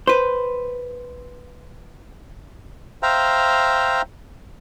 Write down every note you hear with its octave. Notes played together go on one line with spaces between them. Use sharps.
B4 C5
C5 E5 F5 G5 A#5